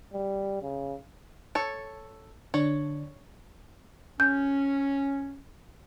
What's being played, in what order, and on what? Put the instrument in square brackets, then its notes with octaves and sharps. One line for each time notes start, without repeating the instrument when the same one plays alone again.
[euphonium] G3
C#3
[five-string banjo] A4 C#5
[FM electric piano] D3 D4 [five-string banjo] C#5
[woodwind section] C#4 [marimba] G6